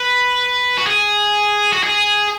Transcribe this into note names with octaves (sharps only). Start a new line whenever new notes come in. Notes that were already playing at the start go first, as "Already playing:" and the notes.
Already playing: B4
F#4
G#4
F#4
G#4